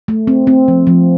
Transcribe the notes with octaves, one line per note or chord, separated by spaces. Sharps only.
A3
C4
C4
F3
F3